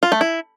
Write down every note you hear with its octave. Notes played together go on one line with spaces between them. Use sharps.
F4
A3
E4